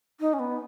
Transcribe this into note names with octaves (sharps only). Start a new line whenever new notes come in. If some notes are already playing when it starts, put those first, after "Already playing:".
D#4
C#4
B3